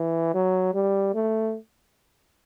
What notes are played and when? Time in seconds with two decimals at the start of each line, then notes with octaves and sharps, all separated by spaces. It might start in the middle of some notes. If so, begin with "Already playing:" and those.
Already playing: E3
0.34 F#3
0.74 G3
1.14 A3